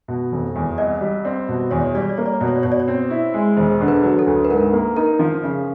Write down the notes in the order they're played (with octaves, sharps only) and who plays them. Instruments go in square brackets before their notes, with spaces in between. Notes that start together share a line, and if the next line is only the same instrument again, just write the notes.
[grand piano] B2
F1
E2
[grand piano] C2 [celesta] D#5
[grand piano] G3
[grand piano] C4 [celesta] D5
[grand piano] B2
[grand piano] E2 [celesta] C#5
[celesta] D5
C#5
[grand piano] G3 [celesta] D5
[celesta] C#5
D5
[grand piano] A#3 [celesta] C#5
[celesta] D5
C#5
[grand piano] B2 [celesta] D5
[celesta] C#5
D5
[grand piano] B2 [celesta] C#5
[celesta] D5
C#5
[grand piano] C4
E4
G#3
[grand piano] E1 [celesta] C5
[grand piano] D3
[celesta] B4
[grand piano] F#3
[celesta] A4
[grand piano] D2
[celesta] B4
[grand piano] G#2 [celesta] A#4
[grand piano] A#3
[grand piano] D#4 [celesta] A#4
[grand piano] F3
C#3